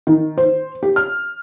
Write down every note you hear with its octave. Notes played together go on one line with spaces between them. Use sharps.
D#3
C5
G4
F6